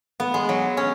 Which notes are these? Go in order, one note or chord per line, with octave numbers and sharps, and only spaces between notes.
B3
G#3
F#3
C#4